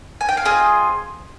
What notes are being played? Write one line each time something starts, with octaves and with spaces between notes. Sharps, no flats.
G#5
G5
F5
C4 F4 G#4 D#5